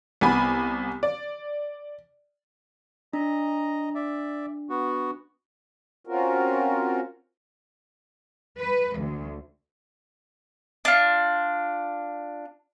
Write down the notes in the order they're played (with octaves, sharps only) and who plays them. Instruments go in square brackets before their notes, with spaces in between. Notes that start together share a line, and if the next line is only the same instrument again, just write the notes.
[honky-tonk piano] C2 B3 G#5 B5
D5
[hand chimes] D4 [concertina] D#5 A#5
[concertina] D5 E5
B3 F#4
[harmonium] C4 C#4 F4 F#4 A#4
[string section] B4
D2
[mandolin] D4 F4